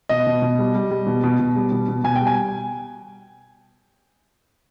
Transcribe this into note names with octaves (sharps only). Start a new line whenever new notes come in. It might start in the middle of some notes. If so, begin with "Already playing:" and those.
B2 D#5
B2
B2
G3
G3
G3
B2
B2
B2
G3
B2
B2
B2 G#5
G5
G3
G#5